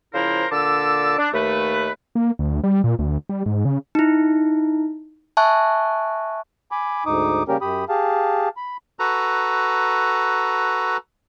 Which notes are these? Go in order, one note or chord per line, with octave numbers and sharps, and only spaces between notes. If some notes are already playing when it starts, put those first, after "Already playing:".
C#3 F3 E4 A#4 C5 A#5
A#2 D3 A5 D6 E6
D4
D#2 A3 B4
A#3
D2
G3
A#2
D2
G3
G#2
C#3
D#4 E4
E5 G#5 A5 C#6 F#6
G#5 B5 D6
D2 G#2 D#4 D6 D#6
C#3 G3 A#3 C#4 G4 A#4
F#2 G4 B5 D#6
G4 G#4 F5 A5
B5
F#4 A4 B4 A#5